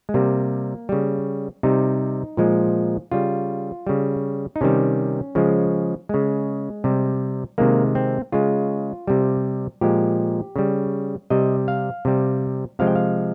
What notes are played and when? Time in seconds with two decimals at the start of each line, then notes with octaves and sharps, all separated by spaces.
0.09 G#3
0.14 C3 G3 A#3
0.89 C#3 G3
1.63 C3 G3 D#4
2.37 A#2 F3 G#3
3.12 C#3 G3 F4
3.87 C#3 G3
4.56 D#4
4.61 C3 D#3 G3 C#4
5.35 C#3 F3 G#3
6.09 C#3 G#3
6.84 C3 G3
7.58 C3 D#3 G#3 A#3
7.95 C4
8.32 C#3 G#3 F4
9.07 C3 G3
9.81 A#2 F3 G#3 G4
10.56 C#3 G3
11.30 C3 G3 D#5
11.68 F5
12.05 C3 G3
12.79 C3 F3 G#3 F5
12.87 G5
12.96 F5